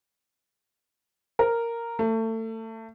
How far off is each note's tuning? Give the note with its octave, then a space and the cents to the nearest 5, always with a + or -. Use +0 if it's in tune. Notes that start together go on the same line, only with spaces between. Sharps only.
A#4 -5
A3 +30